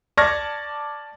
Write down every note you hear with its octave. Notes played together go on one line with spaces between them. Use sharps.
D5 A5 C#6 F6 G#6 A#6